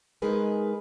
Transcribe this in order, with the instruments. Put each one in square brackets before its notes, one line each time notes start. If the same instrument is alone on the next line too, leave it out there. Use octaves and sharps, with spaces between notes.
[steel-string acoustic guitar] G#3 D#4 G#4 A#4 B4 G#5